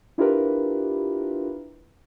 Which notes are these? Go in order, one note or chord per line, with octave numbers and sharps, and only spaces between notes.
D4 E4 F4 G4 A#4 B4